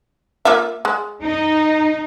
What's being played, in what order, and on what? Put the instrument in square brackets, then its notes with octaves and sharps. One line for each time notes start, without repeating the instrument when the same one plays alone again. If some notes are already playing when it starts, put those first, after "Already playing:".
[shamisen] A#3 F4 E5
G#3
[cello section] D#4